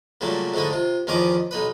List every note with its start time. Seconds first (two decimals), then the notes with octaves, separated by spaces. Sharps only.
0.21 A#2 C#3 F#3 G3 A3
0.54 G#2 D3 A3 E4 D#5
0.70 C3 F4
1.07 E2 D#3 F3 C#4 D#5 D6
1.51 B1 D#4 B4